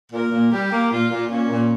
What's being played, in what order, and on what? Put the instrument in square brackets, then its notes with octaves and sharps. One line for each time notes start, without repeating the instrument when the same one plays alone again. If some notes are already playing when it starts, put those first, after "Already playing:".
[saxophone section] A#2 [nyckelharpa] A#4
[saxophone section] A#2
[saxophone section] G3 [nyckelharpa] G4
[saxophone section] A#3
[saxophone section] A#2 [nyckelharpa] F4
[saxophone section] A#2
[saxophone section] A#2 [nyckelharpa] C#4
[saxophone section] A#2